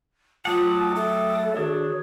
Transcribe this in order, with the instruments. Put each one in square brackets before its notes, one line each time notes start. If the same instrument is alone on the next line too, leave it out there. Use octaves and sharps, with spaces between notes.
[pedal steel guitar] F#3 A3 F#5 [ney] F4 [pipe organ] G5 D6 D#6 [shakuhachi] A5
[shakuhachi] A4 [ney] E5
[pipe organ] D#3 G#4 C#5 [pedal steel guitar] D4 [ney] F#4